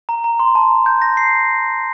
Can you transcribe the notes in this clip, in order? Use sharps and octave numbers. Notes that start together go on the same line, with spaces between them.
A#5
A#5
C6
A5
A#5
G6
A#6
C7